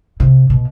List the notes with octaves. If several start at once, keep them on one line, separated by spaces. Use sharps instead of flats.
C3
B2